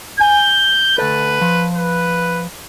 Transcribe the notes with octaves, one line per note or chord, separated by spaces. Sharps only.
G#5 G6
D2 A4 B4
F3
B4